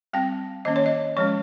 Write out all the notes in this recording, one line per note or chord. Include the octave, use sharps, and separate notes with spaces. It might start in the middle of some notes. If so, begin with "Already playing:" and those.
G3 C4 G5
D#3 A#3 C#4 D#5
C#5
D#5
F3 G#3 C#4 C#5